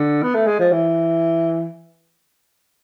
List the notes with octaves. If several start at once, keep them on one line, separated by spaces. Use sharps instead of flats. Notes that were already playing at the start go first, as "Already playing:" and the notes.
Already playing: D3
B3
A3
G#3
F3
E3